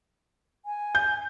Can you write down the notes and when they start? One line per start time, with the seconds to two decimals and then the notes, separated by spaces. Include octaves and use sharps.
0.66 G#5
0.95 G6